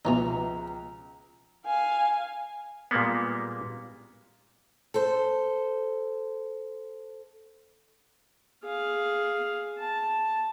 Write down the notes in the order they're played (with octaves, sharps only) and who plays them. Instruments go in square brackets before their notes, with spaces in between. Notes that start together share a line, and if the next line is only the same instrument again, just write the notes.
[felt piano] C#2 F3 [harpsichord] B2 E3 D#4 [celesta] A#5 F7
[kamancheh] F5 G#5
[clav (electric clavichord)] A#2 G3 G#3 A#3 B3
[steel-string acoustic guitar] A4 C5
[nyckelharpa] G#4 F5
A5